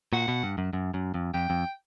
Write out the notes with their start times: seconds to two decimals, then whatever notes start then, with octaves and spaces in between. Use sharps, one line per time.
0.13 A#2 F#5
0.28 B2
0.43 G2
0.58 F#2
0.73 F#2
0.94 F#2
1.14 F2
1.34 F2 G5
1.50 F2